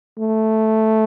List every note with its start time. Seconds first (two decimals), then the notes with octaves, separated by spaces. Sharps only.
0.19 A3